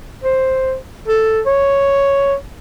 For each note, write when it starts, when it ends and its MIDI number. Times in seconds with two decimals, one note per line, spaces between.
0.24 0.75 72
1.08 1.41 69
1.46 2.34 73